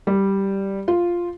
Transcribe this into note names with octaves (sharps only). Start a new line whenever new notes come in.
G3
F4